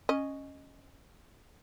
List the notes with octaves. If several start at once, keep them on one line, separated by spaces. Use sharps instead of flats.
C#4 D#5